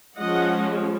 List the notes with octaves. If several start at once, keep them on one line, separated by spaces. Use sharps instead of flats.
F3 G#3 C#4 D#5 F#5